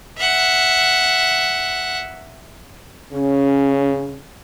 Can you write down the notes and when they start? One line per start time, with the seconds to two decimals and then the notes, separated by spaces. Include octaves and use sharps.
0.18 E5 F#5
3.13 C#3 C#4